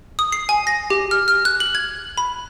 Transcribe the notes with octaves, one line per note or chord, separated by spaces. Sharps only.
D#6
C7
G#5
A#6
G4
F6
F6
F#6
F#7
G#6
B5